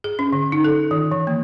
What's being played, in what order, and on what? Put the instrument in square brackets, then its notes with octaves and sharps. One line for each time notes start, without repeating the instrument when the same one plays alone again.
[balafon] G#4
C#4
D3
D#4
A4
D#3
E3
A#3